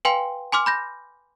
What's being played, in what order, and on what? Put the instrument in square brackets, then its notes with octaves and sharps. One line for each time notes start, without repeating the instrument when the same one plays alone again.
[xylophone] B4 F5 G5 G#5 C6
G#5 C6 D6 F6
B5 G6 A#6